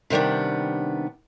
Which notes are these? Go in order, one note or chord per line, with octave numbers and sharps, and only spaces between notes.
C3 D#3 G3 B3 D4